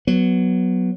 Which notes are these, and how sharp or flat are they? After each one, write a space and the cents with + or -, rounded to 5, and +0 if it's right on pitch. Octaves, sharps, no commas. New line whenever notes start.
F#3 +0 B3 +0